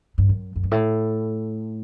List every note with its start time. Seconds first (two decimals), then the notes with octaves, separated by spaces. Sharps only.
0.18 G2
0.29 F#2
0.56 F#2
0.63 G2
0.71 A2